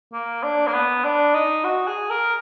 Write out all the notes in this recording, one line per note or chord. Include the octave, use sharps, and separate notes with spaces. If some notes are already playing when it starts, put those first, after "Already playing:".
A#3
D4
A#3
B3
D4
D#4
F#4
G#4
A#4